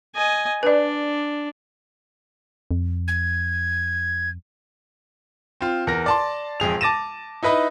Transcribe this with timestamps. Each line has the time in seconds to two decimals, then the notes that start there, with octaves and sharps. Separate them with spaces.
0.15 D#5 G#5
0.63 D4 B4 D5
2.71 F2
3.08 G#6
5.61 C4 F4
5.87 E2 A#4 A#6
6.06 D5 A5 C6
6.60 E1 F2 G#4 F7
6.81 A5 D6 A6 A#6 D#7 E7
7.43 D#4 E4 B4 D#5 B5